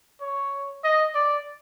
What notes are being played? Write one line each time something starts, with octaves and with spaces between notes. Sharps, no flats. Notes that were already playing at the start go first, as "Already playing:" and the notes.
C#5
D#5
D5